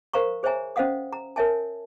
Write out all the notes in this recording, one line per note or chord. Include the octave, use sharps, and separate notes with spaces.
A#4 C5 F5 A#5 C#6
G#4 C5 C#5 E5 G#5 A#5
C#4 C5 D#5 F5 F#5 D#6
A#5
A#4 C#5 E5 G#5 A5